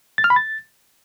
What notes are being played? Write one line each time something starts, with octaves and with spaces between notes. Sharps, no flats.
A6
F6
B5
A6